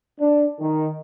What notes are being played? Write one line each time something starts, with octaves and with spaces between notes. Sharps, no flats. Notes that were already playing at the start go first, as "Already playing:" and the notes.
D4
D#3